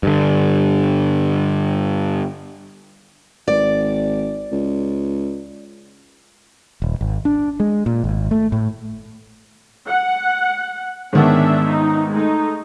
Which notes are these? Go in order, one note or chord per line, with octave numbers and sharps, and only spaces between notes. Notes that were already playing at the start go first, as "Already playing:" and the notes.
G2 D3
G#1 D5
C#2
D#1
G#1
D4
G#3
A#2
G#1
A3
A2
F#5
G#2 D#3 B3 C#4 D4 E5
D#4
G#3 A3 D#4